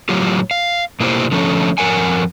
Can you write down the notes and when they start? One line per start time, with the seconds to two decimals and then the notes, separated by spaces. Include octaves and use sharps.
0.09 A2 F#3 F4 G4
0.51 F5
1.00 B2 A#3 E4 F4 G4 C5
1.31 D3 F3 A3 C#4
1.78 F2 G#3 A#4 F#5 G#5